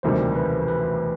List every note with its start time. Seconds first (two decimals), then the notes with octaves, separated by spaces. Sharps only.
0.03 E1 D2 C3 D#3 G3 C5
0.36 B4
0.68 B4